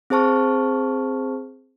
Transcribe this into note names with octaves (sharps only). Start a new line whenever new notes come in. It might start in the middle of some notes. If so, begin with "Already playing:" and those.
C4 G#4 C5 A5 C#6 F6